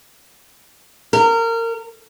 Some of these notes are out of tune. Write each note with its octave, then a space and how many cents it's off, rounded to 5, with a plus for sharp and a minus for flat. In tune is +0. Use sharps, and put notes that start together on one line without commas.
A#4 -25